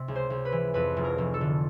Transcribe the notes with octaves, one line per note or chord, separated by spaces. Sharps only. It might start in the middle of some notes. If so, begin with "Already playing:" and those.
Already playing: C3
C#2
C5
C#2
B4
E3
F2 B4
F1
A#4
F1
A4
D3